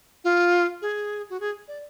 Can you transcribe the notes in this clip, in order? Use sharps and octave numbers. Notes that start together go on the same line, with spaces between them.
F4
G#4
F#4
G#4
D5